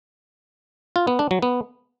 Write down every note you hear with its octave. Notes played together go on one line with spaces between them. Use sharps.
F4
B3
D4
F#3
B3